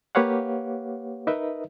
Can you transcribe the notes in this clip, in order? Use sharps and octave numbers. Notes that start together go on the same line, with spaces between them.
A#3 G4 B4 C#5 F5 F#5
D#4 A#4 B4 D#5 E5